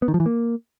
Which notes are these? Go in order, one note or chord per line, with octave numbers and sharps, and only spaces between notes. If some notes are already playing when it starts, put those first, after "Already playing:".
B3
D#3
F3
E3
A#3